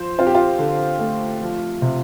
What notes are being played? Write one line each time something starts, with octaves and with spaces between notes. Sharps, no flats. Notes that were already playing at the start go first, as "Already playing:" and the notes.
Already playing: F3 C5
C4 F4
G4
F4
D3
A3
F3
C3